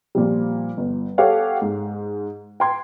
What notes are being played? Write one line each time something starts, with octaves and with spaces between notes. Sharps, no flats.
A#2 F3 G3
G1
G4 A4 C#5 F5 F#5
G#2
G5 A#5 C6 G#6